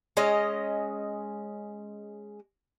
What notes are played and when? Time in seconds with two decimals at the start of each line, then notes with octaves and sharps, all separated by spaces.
0.17 G#3 C#4 D#5